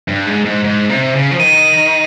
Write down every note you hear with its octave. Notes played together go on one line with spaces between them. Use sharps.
G2
G#2
G#2
G#2
C3
C#3
F3
D#3 D#7